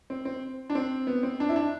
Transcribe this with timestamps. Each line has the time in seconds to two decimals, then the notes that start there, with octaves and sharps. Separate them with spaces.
0.10 C4
0.25 C4
0.70 D4
0.75 C4
1.07 B3
1.23 C4
1.40 D4
1.49 E4
1.56 D4